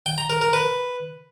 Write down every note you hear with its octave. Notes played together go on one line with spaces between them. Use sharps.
G5
A#5
A#4
A#4
B4